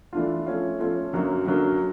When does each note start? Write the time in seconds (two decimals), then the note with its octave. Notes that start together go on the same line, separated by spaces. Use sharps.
0.13 E3 A3 D4 F4
0.46 F3 A3 C#4 F4
0.79 F3 A3 C#4 F4
1.13 F#2 D3 F#3 A#3
1.46 F#2 D3 F#3 A#3